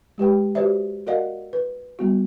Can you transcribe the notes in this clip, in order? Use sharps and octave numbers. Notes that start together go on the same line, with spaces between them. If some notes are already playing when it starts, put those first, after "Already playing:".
G#3 G4 B4 G5
F#4 G4 B4 C5 D5 E5
F#4 A#4 D5 D#5 F5 F#5
B4
G3 B3 F#4